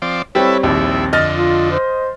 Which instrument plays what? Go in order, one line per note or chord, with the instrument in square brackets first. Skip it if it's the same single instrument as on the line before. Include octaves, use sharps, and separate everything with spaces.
[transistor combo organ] F3 C4 D5
[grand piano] G3 C4 [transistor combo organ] E4 A4 B4 [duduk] C#5
[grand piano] A#1 D#2 G3 [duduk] C4 [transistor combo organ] E4
[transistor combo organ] F2 D3 [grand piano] D#5 F6 A6
[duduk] F4
C5